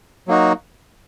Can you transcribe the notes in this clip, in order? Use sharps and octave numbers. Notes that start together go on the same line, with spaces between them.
F#3 A#3 D#4 F#4